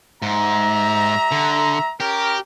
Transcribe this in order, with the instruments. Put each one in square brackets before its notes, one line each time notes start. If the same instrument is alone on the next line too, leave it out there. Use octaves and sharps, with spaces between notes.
[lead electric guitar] G#2 [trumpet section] G3 E5 A#5
[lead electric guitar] D3
[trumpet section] C#4 A#4 [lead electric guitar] G4